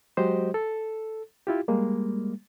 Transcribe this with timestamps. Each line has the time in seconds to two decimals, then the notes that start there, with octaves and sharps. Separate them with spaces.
0.17 F#3 G#3 F#4 G4 C5 D#5
0.54 A4
1.47 E4 F4 G4
1.68 G3 G#3 A#3